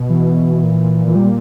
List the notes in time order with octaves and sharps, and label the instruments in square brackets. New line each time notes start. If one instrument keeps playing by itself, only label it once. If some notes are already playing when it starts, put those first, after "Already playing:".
Already playing: [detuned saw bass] B2
[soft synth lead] E3
[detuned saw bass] A#2
[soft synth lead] E3
G3